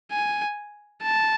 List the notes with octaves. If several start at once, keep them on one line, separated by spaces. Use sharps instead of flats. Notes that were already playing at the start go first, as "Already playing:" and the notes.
G#5
A5